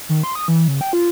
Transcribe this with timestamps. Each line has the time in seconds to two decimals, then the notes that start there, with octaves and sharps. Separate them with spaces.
0.09 D#3
0.23 C6
0.35 D#6
0.48 E3
0.68 C#3
0.81 G5
0.93 F4